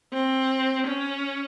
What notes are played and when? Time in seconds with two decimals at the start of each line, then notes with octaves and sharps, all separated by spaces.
0.13 C4
0.86 C#4